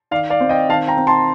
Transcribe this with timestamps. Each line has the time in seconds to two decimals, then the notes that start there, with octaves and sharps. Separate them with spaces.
0.11 D#3 D5 F5
0.30 D5 F5
0.40 C4
0.49 D#5 G5
0.69 D#3 F5 A5
0.88 G5 A#5
0.97 C4
1.07 A5 C6